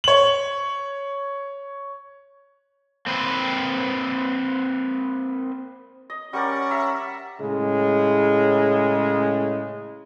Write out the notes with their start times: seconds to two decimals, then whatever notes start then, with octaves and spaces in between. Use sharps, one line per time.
0.04 C#5 F#7
3.06 A#3 C4 B4 C5
6.10 D#5
6.33 G3 C#4 A#4 D5 F#5 C#6
6.71 E5 A#5
7.39 A2 C#3 G#3